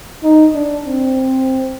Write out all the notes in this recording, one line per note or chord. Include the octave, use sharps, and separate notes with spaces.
D#4
D4
C4